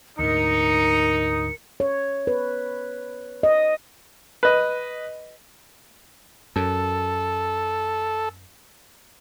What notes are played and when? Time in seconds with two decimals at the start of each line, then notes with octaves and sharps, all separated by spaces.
0.19 D2 G#2 D#4 A#4 C#7
1.80 C#5
2.27 B4
3.43 D#5
4.43 B4 D#5
6.56 F#2 A4